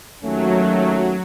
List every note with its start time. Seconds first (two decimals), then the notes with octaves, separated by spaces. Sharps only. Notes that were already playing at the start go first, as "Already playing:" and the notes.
0.23 D#2 F#3 A3 C#4